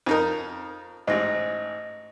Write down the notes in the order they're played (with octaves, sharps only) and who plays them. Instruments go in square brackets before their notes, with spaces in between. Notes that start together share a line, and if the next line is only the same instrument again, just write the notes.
[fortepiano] F2 D#4 A#4
[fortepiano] A1 G#2 [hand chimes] D#5 A#6